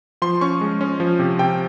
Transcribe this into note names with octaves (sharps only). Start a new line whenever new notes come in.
F3 C6
C#4 C#6
G#3
C#4
F3
C3
C3 G5